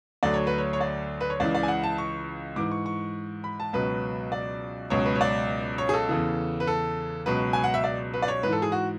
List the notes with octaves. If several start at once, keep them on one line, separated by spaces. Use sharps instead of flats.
D2 D3 F#3 D5
C#5
B4
C#5
C#5
D5
B4
C#5
C#2 C#3 E3 D5
D5
G#5
F#5
A5
C#6
G#2 E3 D6
C#6
C#6
B5
A5
C#2 B2 F#3 B4
D5
C#2 B2 F#3 C#5
B4
C#5
D5
C#5
G#4
A4
E2 C#3 E3
B4
A4
C#2 B2 F#3 B4
G#5
F#5
E5
D5
B4
D5
C#5
G#2 E3 B4
A4
G#4
F#4